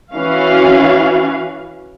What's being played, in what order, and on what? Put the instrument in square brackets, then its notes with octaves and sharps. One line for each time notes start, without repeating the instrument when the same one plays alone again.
[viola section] E3 C#4 F#4 F5